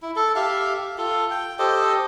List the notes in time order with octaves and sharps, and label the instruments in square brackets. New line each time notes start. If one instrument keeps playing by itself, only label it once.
[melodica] E4
A4
G4 E5 F5
F4 A4
G5
G4 A4 C5 D#5